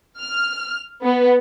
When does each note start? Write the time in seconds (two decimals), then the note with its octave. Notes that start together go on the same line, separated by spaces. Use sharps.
0.19 F6
1.03 B3